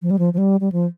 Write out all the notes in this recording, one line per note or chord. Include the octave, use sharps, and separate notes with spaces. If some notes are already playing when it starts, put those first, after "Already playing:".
F3
G3
F3
F3
G3
G3
F3